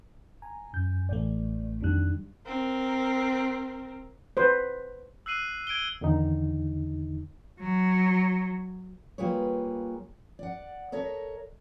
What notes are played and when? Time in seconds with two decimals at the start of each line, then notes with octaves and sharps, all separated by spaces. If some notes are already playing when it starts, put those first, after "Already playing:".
0.42 G#5 A#5
0.73 F#2 G6
1.09 A1 E3 A3 D5
1.81 F2 D#3 G3 D4 F#6
2.46 C4 A#4
4.37 B4 C5
5.26 E6 F#6 C7 D#7 F#7
5.67 G#6 D7 D#7 G7
6.01 E2 D3 D#3 D#4
7.60 F#3
9.18 G3 A#3 F4 G#4 B4 C#5
10.39 D5 F#5
10.92 A4 A#4 C#5 D#5 E5